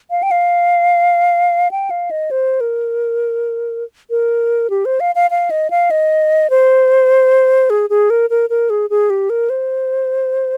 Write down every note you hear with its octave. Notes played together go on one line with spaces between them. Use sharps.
F5
G5
F5
G5
F5
D#5
C5
A#4
A#4
G4
C5
F5
F5
F5
D#5
F5
D#5
C5
G#4
G#4
A#4
A#4
A#4
G#4
G#4
G4
A#4
C5